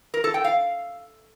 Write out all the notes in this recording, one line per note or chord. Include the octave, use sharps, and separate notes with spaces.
A#4
A4
G5
F5